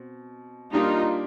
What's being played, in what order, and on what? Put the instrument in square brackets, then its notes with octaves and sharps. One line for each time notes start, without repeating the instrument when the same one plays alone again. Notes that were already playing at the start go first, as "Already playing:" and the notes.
Already playing: [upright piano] B2 C4
[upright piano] G3 A#3 D4 G4 A#4 [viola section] D#4 F4